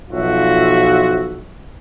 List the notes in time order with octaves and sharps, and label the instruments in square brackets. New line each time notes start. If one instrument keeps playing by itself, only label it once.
[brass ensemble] B1 F3 F4 F#4 E5